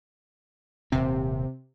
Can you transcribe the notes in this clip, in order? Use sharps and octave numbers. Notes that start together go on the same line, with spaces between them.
D#1 C3 C4